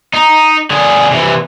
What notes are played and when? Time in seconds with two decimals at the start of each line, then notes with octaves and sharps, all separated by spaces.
0.14 D#4
0.71 D3 G#4
1.11 C3 E3